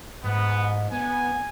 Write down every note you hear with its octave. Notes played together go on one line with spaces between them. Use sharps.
G#2 B3
B3 G#5